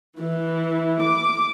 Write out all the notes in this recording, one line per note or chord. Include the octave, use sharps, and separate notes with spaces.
E3
D6